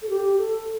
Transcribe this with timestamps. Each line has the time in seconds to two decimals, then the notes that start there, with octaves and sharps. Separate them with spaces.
0.02 A4
0.09 G4
0.38 A4